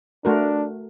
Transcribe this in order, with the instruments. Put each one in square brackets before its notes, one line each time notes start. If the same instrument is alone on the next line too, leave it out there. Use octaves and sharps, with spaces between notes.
[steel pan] A3 F#4 A#4 [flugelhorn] D4